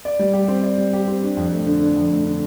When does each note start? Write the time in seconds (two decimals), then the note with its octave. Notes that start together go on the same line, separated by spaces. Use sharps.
0.05 D5
0.19 G3
0.33 G4
0.48 C4
0.63 D5
0.78 G3
0.93 G4
1.08 C4
1.23 D4
1.37 F2
1.52 A3
1.66 D3
1.82 D4
1.96 F2
2.11 A3
2.26 D3